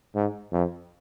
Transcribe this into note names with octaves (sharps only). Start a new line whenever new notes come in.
G#2
F2